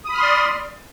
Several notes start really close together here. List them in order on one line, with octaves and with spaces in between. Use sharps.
D#6 B5 F6 C6 D5